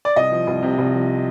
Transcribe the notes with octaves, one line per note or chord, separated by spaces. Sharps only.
D5
C2 D#5
F3
C2
C3
C2
F3